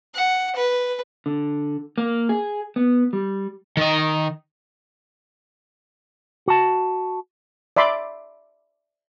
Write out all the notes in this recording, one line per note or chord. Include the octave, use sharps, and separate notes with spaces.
F#5
B4
D3
A#3
G#4
B3
G3
D#3 D#5
F#4 A5
D5 E5 B5 C6 D6